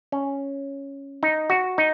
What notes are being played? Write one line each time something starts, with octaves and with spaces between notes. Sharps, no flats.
C#4
D#4
F#4
D#4